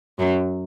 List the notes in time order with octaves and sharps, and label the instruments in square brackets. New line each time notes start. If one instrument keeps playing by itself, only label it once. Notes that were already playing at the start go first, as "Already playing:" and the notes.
[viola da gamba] F#2 F#3